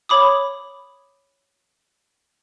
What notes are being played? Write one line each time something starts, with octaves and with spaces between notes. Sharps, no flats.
C#5 B5 D6 D#6